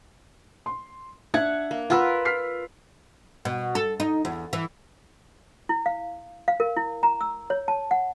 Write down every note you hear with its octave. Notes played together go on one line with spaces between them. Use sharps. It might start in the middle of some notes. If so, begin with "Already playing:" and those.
C6
D4 E5 F#5 G#6
A#3
F4 A#4 B4 F#5 E6
F6 B6 C7
B2
A4
D#4
E2
E3
E4
F5
F5
A#4
E4
A#5
E6
C#5
A5
F#5